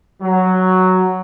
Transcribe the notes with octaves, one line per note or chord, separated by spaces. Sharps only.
F#3